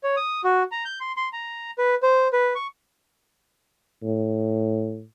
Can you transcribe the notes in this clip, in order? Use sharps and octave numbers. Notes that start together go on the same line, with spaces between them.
C#5
D#6
F#4
A#5
G6
C6
C6
A#5
B4
C5
B4
C#6
A2